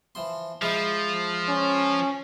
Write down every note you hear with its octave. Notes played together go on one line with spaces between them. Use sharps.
E3 F3 C6
F3 G#3 E4
C#4